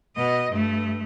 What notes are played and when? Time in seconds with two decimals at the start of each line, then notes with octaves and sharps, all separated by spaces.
0.16 B2 D#5
0.51 G2 A3